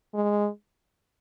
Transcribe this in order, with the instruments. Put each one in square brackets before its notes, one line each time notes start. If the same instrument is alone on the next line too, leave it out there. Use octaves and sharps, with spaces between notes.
[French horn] G#3